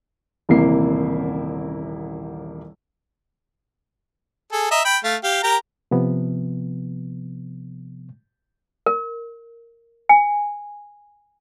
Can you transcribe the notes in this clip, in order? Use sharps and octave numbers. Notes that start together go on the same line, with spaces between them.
D#1 A1 C3 A#3 E4 C7
G#4 A4
D#5 E5 A#5
G5 B5
A3 F5
G4 F5
G4 A#4 A#5
C3 F3 B3
A#4
G#5